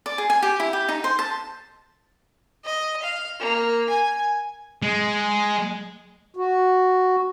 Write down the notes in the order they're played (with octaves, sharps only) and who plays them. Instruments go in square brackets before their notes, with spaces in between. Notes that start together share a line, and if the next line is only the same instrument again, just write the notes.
[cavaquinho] D5
G#4
G#5
G4
E4
G4
D#4
C5
A5
[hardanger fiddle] D#5
F5
A#3
G#5
[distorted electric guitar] G#3
[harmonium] F#4